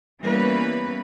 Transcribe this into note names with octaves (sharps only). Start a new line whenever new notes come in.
E3 G3 A#3 B3 C#4 B4